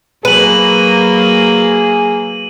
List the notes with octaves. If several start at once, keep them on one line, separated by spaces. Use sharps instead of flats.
F#3 A#3 G#4 B4 D#7 F#7